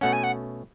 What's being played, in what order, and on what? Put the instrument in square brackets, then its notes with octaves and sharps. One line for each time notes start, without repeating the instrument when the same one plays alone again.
[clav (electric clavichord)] B2 A3 C#4 [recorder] F#5
[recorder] G#5
F#5